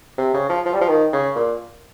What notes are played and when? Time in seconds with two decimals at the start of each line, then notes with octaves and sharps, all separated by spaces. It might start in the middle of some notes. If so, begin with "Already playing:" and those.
0.18 C3
0.34 C#3
0.49 F3
0.65 F3
0.73 G3
0.81 F3
0.89 D#3
1.12 C#3
1.36 A#2